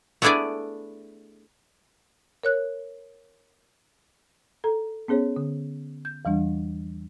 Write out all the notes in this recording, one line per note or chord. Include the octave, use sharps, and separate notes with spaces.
A3 B3 D4 E4 G#4 D5
A#4 C#5 F#6
A4 A#5
B3 C#4 G#4 C5 C#5
D3
G6
E2 E3 G3 D4